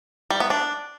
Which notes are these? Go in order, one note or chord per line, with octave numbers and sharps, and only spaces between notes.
G3
B3
D4